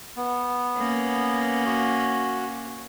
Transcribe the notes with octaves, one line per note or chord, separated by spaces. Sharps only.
B3
A#3 C#4
F#4